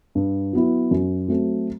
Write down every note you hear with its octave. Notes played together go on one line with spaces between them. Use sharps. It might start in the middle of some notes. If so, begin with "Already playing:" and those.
G2
F#3 B3 E4
F#2
F#3 A3 C4